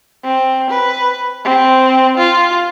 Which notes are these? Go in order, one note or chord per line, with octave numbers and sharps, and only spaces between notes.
C4
B4
C4
F4